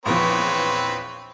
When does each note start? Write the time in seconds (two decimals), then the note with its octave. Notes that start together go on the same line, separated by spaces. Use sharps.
0.06 A#1 E2 F3 C4 B4 C#5